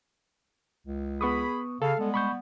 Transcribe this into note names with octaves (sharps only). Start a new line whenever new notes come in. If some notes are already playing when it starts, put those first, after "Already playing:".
C#2
B3 G#4 B5 C#6 D#6
C#3 A4 F5
G3 G#3 B3
B5 C#6 G6